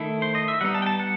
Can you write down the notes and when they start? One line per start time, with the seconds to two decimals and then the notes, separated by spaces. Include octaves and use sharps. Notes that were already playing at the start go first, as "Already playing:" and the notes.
Already playing: D#3 A3 E4
0.22 C5
0.35 D#5
0.48 E5
0.61 G3 B3 D#4 F#5
0.75 A5
0.82 G5
0.86 A5
1.00 F#5